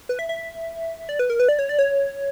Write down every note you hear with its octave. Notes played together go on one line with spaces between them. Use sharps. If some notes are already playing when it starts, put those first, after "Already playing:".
B4
E5
E5
D5
B4
A#4
B4
D5
C#5
D5
C#5